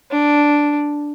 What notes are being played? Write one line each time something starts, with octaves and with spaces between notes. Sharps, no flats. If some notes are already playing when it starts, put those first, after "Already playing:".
D4